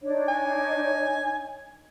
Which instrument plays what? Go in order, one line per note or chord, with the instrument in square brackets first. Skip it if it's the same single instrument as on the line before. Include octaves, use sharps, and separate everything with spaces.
[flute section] D4 D#4 C#5
[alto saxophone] G#5